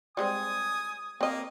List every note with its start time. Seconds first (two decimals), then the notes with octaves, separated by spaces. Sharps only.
0.17 G3 G#3 C4 G#5 D#6
1.21 A#3 C4 D#5